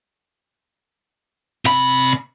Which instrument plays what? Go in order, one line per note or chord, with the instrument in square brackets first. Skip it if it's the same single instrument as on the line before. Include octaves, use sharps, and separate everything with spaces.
[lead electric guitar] C3 B5